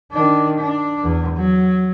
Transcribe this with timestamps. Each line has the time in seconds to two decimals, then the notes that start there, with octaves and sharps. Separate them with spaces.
0.12 D#3 D4
0.59 D4
1.03 E2
1.38 F#3